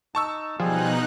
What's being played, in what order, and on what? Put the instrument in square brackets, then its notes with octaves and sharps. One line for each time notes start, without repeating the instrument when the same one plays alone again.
[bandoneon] D#4 [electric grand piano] A5 C#6 E6
[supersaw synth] B2 D#4 F#6 [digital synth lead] F3 [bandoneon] G3 G#4